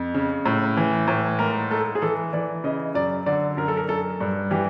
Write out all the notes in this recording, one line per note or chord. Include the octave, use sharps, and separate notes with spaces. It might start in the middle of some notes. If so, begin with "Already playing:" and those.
Already playing: F2
C#3
A2
E3
A2
G#2 A#4
G#2 A4
G#4
E3 A4
E3 D5
C#3 D#5
F#2 D5
D3 D5
F#2 A#4
A4
A#4
F#2 A4
G2
E3 G4